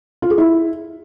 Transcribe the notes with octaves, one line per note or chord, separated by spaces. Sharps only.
F4
G#4
E4